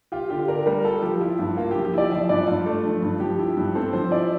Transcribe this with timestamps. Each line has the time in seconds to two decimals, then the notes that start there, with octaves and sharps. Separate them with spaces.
0.12 F4 G4
0.30 D3 G4
0.48 D4 A#4
0.66 G3 A#4
0.84 F4 A4
1.02 F3 G4
1.21 E4 F4
1.39 G2 F4
1.57 A#3 F4
1.71 F3 G4
1.85 G4
1.94 E4 D5
2.11 F3 E5
2.29 G2 D5
2.48 G2 F4
2.66 A3
2.85 F3
3.02 G2
3.20 F3 G4
3.39 E4
3.57 G2
3.75 C4 A4
3.93 F3 C5
4.11 E4 D5